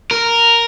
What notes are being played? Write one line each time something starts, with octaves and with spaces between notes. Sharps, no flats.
A#4